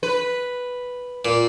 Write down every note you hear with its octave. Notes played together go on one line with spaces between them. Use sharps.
B4
A#2